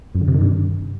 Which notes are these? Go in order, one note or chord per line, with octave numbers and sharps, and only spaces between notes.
F#2
D3
C3
D#3
G2